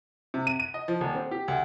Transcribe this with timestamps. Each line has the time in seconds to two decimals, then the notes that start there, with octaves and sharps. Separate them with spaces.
0.34 C3
0.47 D#7
0.60 D#7
0.74 D#5
0.88 F3
1.01 D#1
1.15 C4
1.31 G4
1.48 D2